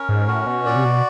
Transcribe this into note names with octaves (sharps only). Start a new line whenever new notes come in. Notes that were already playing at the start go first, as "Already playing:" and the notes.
Already playing: C#4 A#4
G#2
A2 F#4
B2
A#2 D5
C3
B2